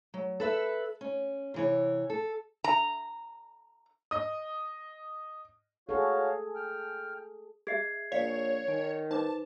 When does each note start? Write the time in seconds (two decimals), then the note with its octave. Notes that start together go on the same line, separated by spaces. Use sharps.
0.14 F#3
0.40 A4 B4 E5
1.01 C#4
1.54 C3 E3 C#5
2.10 A4
2.64 A#5
4.11 D#5 D#6
5.89 F#4 G#4 A4 C#5 F5
6.55 G5 F6
7.67 G#4 D#5 E5 G#6 C7
8.12 A#1 C#5 D5 F5
8.68 D#3 G#5
9.11 D#4 B4 C5 A5 D6